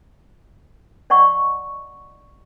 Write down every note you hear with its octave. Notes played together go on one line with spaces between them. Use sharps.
D5 D#5 F#5 C#6